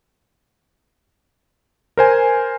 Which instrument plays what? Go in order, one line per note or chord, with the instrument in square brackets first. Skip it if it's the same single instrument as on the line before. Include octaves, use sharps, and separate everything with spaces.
[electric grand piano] A#4 C5 G#5